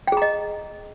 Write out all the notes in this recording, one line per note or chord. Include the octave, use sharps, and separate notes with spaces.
G#4 D#5 G5 A#5